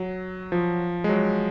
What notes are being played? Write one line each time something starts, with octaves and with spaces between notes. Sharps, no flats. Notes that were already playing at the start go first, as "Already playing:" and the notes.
Already playing: F#3
F3
G#3
F#3